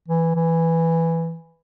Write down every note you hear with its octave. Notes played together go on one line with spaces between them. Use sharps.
E3
E3